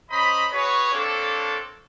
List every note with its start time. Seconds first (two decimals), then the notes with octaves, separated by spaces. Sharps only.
0.10 C#4 C5 D#5 A#5 B5
0.52 F#4 G#4 B4 C#5
0.92 A#3 C4 D4 A4 C#5 D6